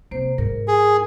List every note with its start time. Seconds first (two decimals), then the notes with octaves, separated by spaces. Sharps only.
0.11 C3 A#3 C5
0.38 G#2 A#4
0.68 G#4